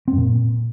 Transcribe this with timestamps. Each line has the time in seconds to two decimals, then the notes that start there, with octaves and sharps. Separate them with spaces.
0.08 C4
0.13 F#2
0.18 A#2